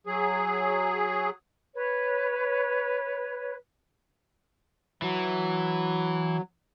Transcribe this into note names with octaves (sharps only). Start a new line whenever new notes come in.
F#3 G#4
B4 C#5
E3 F#3